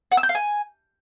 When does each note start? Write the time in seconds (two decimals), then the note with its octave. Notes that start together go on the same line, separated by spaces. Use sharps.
0.12 F#5
0.17 E6
0.23 G6
0.29 F5
0.35 G#5